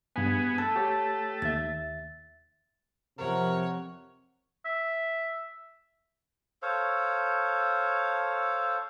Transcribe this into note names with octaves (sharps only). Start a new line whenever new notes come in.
G2 B3 G#4 G#5
A3 A5 E6
G4 C#5 G5
D#2 E5 A6
F2 C3 A#4 C#5 F#5
E5
A4 C5 C#5 F5